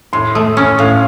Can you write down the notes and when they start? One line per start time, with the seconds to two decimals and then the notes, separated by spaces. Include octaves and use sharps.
0.13 A2 C6
0.35 A3 D#6
0.57 C#4 C#6
0.79 A2 F5